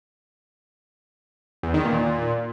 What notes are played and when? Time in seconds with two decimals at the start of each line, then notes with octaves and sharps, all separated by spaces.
1.63 E2
1.74 D#3
1.85 A#2